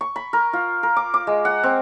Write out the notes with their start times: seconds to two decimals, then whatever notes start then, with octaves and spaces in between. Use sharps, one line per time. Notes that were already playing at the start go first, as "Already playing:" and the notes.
0.01 C#6
0.16 B5
0.33 A#4
0.53 F4
0.83 A#4
0.96 D6
1.14 D6
1.27 G#3
1.45 F#5
1.64 C4